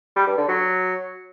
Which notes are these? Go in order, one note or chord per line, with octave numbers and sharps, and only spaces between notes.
G3
G2
D3
F#3